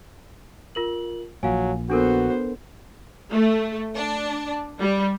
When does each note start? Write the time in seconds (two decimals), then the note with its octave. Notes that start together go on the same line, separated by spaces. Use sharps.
0.75 F4 A#4 F#7
1.43 A#1 A#2 F#3 F5 G#5
1.90 B3 D4 F#4 A4 A#4 C5
3.31 A3
3.96 D4
4.80 G3